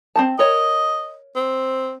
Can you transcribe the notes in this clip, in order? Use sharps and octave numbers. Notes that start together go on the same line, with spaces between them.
C4 F#4 A5
A#4 C#5 D#5
C4